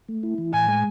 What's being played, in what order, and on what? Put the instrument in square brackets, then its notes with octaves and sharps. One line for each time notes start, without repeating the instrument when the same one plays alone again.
[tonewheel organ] A3
E4
E3
[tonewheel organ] A2 [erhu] G#5
[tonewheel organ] G#3